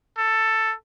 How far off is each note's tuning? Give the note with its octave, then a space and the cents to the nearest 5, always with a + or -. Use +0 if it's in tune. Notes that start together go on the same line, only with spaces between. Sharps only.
A4 +10